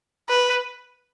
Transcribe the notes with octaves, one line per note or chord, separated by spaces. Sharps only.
B4